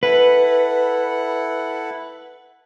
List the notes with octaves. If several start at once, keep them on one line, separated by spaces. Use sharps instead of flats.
E4 A4 B4 F#5